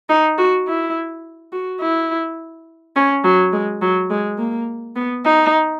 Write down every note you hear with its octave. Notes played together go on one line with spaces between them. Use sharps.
D#4
F#4
E4
F#4
E4
C#4
F#3
G#3
F#3
G#3
A#3
B3
D#4